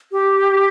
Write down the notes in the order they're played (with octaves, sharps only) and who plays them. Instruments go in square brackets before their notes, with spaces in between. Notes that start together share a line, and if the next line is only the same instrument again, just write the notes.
[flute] G4